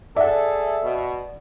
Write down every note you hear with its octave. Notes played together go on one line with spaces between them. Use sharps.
G#4 A4 D5 E5 F#5
B2